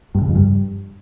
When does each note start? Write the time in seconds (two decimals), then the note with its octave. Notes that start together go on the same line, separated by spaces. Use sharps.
0.15 G2
0.22 C#3
0.28 F2
0.35 G2